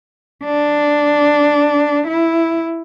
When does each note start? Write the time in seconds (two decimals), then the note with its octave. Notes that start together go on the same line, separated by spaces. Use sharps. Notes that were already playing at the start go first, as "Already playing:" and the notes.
0.45 D4
2.07 E4